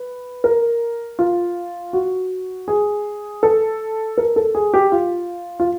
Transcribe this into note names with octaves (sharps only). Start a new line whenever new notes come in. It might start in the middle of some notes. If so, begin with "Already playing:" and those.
Already playing: B4
A#4
F4
F#4
G#4
A4
A#4
A4
G#4
G4
F4
F4